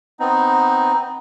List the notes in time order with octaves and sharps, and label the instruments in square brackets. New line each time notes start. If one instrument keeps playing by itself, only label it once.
[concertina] B3 C4 D#4